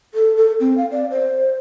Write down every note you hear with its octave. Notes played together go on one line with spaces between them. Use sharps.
A4
A4
C4
F5
D5
C5